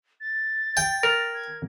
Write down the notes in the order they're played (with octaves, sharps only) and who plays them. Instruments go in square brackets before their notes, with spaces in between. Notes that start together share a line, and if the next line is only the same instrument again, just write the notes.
[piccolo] A6
[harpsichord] G5
[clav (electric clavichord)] A#4
[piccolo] G#6